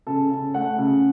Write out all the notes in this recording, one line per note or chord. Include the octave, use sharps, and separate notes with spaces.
C#3 A4
C#3
A3 F#5
C#3